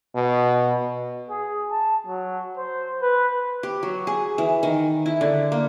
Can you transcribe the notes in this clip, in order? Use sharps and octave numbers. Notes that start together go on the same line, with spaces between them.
B2
G#4
A5
F#3
C5
B4
G4
F#3
G#4
E3
D#3
E4
D3
A#3